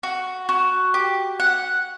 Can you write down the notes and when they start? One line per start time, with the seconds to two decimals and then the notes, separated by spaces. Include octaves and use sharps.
0.03 F#4
0.49 F#4
0.94 G4
1.40 F#5